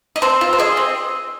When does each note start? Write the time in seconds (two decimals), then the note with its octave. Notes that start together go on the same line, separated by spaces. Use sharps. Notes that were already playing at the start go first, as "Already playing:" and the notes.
0.16 D#5
0.22 C4 C5
0.41 F4
0.53 C5
0.58 G#4 D#5
0.77 C4